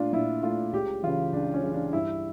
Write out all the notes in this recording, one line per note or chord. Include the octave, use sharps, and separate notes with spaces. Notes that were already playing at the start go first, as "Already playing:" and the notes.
Already playing: A#2 A3 D4 F4
A#2 E4
A3 F4
C#2 G4
C#3 E3 F4
C#2 D4
C#4
C#3 E3
D4
G2 E4